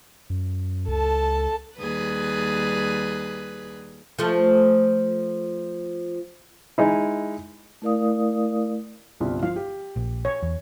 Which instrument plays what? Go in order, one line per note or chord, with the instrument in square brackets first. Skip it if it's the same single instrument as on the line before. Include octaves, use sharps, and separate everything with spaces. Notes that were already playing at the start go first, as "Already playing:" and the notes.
[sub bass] F#2
[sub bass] C#2 [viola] A4 A5
[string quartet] D#2 G3 G#4 B4 F#6
[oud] F3 A3
[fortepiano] G#3 D#4 E4
[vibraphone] A3 E4 A#4 D5 F5 D#6
[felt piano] G1 C2 F4
[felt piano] F3 [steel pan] F5
[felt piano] G4
[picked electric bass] A#1
[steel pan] C#5
[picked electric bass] E2